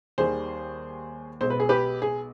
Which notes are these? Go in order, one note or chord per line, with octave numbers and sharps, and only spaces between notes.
D#2 D#3 G3 G#4 C5
B1 B2 G#3 C5
B4
G#4
G4 B4
G#4